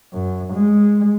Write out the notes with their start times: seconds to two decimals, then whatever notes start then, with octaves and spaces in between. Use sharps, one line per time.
0.13 F#2
0.53 G#3